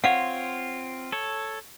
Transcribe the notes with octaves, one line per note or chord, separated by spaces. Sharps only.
C4 F4 C#5 F5 F#5
A4 C#5